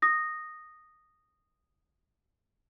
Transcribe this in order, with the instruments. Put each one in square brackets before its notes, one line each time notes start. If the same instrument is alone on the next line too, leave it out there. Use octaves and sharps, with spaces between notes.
[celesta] D#6 A#6